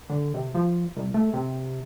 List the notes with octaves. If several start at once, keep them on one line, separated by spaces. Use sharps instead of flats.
D3
C3
F3
C2
A3
C3